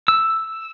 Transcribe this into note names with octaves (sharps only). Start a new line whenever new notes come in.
E6